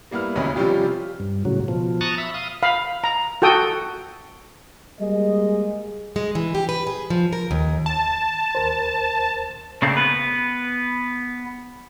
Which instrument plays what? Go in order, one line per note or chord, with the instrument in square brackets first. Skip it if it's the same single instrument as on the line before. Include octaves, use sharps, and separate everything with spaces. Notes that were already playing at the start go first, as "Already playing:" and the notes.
[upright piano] G3 A#3 B3 E4 F6
E1 D2 C3 C#4 D#5 B5
C3 F3 G3 C#4 F4 G4
[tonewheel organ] G2
A2 C#3 F#3
B2 F3
A5 A#5 C#6 D#6 F#6 A6
E5 B5
F5 D#6
[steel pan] F5 B5
A#5
F#4 A4 G5 D#6
[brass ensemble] G3 G#3 A#3 G#4 D#5
[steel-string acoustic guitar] G#3
E3
G4
B4
G#4
F3
A#4
D#2
[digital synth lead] A5
[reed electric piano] D#2 A#4 C5
[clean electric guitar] C#3 A3 A#3 C4 D4
B3 B4